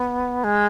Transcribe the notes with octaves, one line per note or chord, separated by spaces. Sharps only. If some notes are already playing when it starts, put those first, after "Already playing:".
Already playing: B3
G#3